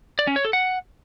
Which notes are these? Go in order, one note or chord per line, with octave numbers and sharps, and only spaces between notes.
D5
C#4
C#5
A4
F#5